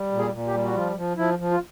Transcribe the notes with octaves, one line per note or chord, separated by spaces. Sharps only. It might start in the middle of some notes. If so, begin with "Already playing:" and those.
Already playing: G3
A#2
G#4
A#2
G4
G3
F#4
F3 F4
F3
F3 E4
F3
F4